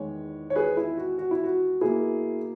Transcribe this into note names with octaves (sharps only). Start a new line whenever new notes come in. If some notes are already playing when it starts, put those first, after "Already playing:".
Already playing: E2 D#3 G#3 C#5
C#5
G#4 B4
E4
F#4
F#4
E4
F#4
B2 A#3 E4 G#4